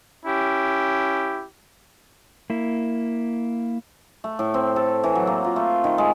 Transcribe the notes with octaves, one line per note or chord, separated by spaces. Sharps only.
C#4 E4 G4
A#3 E4
A3
A2
C4
A4
E3
F#3
A#3
F4
A3
D#3
G#3